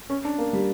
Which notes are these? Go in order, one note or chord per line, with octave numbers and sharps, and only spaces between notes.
C#4
D4
A#3
G3